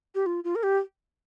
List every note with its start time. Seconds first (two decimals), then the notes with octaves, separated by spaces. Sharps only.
0.15 G4
0.26 F4
0.44 F4
0.55 A#4
0.63 G4